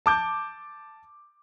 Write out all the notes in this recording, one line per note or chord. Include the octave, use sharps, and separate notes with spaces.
A5 D6 G6